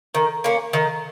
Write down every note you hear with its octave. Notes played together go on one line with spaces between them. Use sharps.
D#3
A#3 C#4
D#3